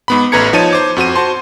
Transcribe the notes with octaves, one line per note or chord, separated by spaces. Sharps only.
G#2 B3 B5
A1 A3 B4 A#5 G#6 C#7
F3 D#4 C#5 A5 D#7
C5 D6
F2 F#4 C5 D#7
F#4 C5 A5 C6